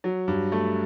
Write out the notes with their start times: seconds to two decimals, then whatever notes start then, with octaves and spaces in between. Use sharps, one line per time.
0.04 F#3
0.28 G2
0.52 A3